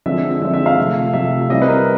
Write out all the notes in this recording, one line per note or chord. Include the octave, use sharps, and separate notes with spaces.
D3 F3 G#3 C4 E5
D3 F3 G#3 C4 E5
E5
F5
C3 F3 A3
C3 F3 A3 E5
E3 G3 C4 D#5
B4
A#4